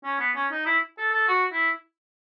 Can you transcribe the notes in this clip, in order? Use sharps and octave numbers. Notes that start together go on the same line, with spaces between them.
C#4
B3
C#4
D#4
E4
A4
A4
F#4
E4